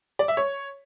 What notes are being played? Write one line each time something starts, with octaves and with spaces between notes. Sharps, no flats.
D5
E5
C#5